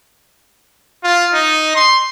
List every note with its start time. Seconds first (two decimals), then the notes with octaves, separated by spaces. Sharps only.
1.03 F4
1.34 D#4
1.75 C6